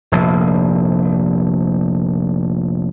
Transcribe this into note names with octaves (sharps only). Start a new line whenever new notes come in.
F1 A#1